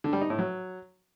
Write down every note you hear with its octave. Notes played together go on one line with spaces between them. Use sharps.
D3
G3
D#4
A2
F#3